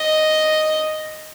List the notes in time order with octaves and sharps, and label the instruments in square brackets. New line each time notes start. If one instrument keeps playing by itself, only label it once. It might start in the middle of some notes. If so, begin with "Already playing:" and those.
Already playing: [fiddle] D#5